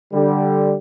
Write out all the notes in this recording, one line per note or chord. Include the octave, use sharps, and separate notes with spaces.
D3 G3